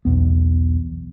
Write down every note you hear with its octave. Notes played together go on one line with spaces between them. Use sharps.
B1 E2 B3